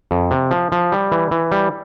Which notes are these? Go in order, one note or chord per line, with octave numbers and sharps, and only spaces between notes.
F2
C3
F3
F3
G3
E3
E3
G3